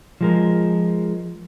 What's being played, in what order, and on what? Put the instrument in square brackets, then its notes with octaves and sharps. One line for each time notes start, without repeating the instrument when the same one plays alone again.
[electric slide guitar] F3 G#3 A#4